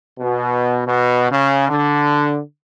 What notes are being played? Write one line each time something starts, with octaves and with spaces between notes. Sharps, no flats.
B2
B2
C#3
D3